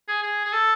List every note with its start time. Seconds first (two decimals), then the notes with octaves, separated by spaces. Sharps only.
0.08 G#4
0.22 G#4
0.45 G#4
0.53 A4